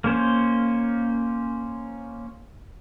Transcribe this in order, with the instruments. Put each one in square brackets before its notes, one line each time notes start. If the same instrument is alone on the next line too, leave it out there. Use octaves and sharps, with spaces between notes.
[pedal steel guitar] A#3 C#4 C5